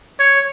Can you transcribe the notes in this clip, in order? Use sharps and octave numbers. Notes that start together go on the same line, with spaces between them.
C#5